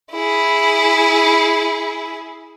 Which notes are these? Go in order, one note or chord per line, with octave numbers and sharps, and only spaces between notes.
E4 G#4